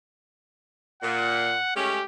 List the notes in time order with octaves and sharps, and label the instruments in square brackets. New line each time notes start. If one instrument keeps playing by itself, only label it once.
[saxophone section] A#2 [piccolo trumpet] F#5
[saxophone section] G#3 A3 C#4 [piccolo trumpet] G4